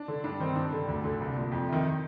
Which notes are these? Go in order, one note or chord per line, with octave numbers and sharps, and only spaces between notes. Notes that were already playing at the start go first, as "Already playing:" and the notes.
Already playing: D4
D3
G2 D4
D#3 C4
G2 D4
D3
D2
D3
C2
A#2
F2
C3 D#3